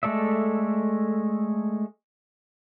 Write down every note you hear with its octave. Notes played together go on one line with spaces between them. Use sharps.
G#3 A3 A4 D5 E5